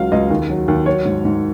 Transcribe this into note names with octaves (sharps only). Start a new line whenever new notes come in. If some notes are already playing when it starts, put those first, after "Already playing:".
Already playing: C#2 F#3 F5
C#2 D#5
D#2
F#3
D#2
F#3 C#5
G#2
G#2